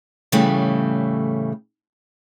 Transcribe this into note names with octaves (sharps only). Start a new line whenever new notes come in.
A2 C#3 E3 G3 A3